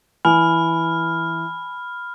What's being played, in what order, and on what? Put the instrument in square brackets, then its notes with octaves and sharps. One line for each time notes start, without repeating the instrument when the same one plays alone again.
[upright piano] E3 [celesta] G#5 [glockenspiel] B5 [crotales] F6